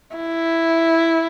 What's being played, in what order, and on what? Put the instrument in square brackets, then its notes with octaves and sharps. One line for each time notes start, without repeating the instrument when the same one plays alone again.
[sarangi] E4